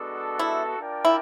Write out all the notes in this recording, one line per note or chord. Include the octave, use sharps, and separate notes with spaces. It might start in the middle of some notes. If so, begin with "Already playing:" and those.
Already playing: G#3 B3 D4 F#4 A4
E4
D4 F4 A#4 D5 G5
E4